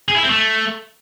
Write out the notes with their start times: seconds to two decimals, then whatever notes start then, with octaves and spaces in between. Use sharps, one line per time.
0.08 G#4
0.16 E4
0.23 C4
0.30 A3